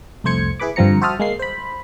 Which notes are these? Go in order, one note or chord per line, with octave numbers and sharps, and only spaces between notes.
C2 F2 A3 C5 G#6 C#7
E4 G#4 B4 B5 D6
G2 D3 F3 C4 A#5 C#7
F#4 C5 E5 A5 D#6 F6
G#3 A#3 C7
C5 B5